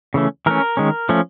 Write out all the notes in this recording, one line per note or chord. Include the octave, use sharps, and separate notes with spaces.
C#3 E3 A3 C#4
E3 A3 C#4 A#4
D#3 G#3 C#4
F3 A3 C#4